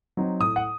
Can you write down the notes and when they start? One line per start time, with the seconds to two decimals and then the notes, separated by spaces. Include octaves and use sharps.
0.17 F#3 C4 D#4
0.40 A2 D#6
0.56 F#5